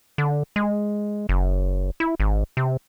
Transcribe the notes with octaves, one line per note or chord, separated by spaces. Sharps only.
D3
G#3
F#1
E4
G#1
C3